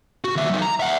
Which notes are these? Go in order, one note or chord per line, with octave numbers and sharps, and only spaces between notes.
F#4
D#2 E5
F#3 D#4
A#5
E5 F#5